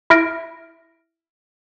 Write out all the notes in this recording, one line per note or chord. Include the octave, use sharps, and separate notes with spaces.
E4 E5 F6 A#6 D7